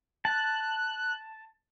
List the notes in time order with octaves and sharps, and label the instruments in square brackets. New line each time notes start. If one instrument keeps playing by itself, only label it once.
[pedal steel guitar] A5 [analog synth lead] F#6